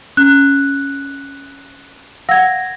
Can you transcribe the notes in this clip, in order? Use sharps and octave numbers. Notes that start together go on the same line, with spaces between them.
C#4 F#6
F5 F#5 E6 G#6 A#6